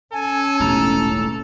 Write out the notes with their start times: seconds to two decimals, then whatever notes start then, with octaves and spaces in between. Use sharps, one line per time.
0.13 C#4 A4 G#5
0.60 E1 A1 D#2 A#5